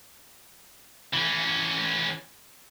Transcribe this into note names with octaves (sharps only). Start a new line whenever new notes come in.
E3 C#4